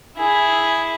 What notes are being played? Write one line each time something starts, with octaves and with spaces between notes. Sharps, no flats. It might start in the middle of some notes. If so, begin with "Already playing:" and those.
E4 G#4